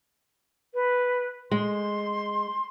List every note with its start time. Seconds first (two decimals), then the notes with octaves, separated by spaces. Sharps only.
0.74 B4
1.51 G#3 C6